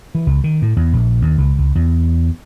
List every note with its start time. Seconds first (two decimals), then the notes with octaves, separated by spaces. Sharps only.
0.15 E3
0.27 C#2
0.44 D#3
0.62 A2
0.76 E2
0.93 A#1
1.22 D#2
1.38 C#2
1.59 C#2
1.75 E2